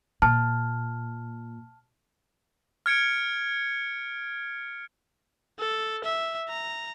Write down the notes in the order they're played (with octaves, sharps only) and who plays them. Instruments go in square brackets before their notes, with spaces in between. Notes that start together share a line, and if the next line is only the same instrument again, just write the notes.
[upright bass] A#2 [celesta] A5 F6
[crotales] F6 G#6 C#7 D7
[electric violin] A4
E5
A#5